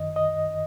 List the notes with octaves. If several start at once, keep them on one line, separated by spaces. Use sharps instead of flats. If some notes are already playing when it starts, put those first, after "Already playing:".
Already playing: F#2 D#3 D#5
D#5